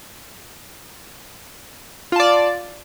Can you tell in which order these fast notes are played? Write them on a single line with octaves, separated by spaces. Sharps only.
F4 A5 D5